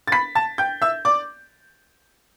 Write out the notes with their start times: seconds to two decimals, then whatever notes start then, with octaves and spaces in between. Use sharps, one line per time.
0.07 A6
0.12 B5 B6
0.35 A5 A6
0.58 G5 G6
0.82 E5 E6
1.05 D5 D6